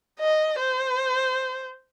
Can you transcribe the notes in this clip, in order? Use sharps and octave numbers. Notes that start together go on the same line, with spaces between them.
D#5
C5